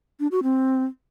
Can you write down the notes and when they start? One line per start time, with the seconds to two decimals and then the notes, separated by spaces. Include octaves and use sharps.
0.20 D4
0.31 F#4
0.43 C4